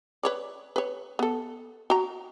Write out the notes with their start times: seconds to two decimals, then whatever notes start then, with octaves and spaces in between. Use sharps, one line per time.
0.23 B4 C#5 D5
0.76 B4 C#5
1.19 B3 A4
1.90 F#4 A#5